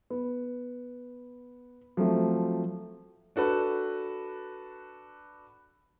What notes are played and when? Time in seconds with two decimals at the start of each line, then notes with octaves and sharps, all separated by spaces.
0.10 B3
1.97 F3 F#3 A3 C4
3.36 D4 F#4 A4 B4